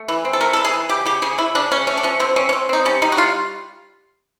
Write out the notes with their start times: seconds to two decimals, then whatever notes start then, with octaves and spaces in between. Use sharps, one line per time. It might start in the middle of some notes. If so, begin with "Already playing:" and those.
Already playing: A3
0.08 E3
0.25 C4
0.33 A4
0.41 A3 A#4
0.53 A4
0.57 E3
0.65 G#4
0.73 E3
0.89 C#3 G4
1.06 C#3 G4
1.22 C#3 G#4
1.38 C#3 E4
1.55 C#3 D4
1.71 C#3 C#4
1.87 A3 C#4
1.97 D4
2.03 F3 C#4
2.19 D3 C4
2.36 C4 C#4
2.49 C#4
2.53 C4
2.69 C4 D#4
2.85 G3 C#4
3.02 G3 D#4
3.12 F#4
3.17 G3 F4